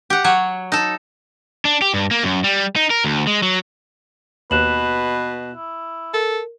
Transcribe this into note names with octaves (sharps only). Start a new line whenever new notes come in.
G4 F#5
F#3 C#5 F#5
D#4 A4
D4
G4
G2
A#3
F#2
G3
D#4
A#4
D2
G#3
F#3
D#2 B2 B4 F#6 E7 F#7
E4
A4 A#4